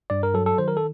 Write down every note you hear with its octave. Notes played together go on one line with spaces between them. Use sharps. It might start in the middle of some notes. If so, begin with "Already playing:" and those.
G2 D5
A#4
F#3 A4
A4
D#3 C5
A#4
A4